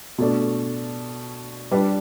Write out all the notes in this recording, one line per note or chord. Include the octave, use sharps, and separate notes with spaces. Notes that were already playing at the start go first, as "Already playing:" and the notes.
B2 A3 D4
G3 D4 B4